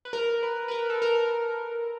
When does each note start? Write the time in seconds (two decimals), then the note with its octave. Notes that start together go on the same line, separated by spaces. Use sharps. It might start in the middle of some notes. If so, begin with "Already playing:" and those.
0.05 B4
0.13 A#4
0.43 B4
0.68 B4
0.71 A#4
0.90 A4
1.02 A#4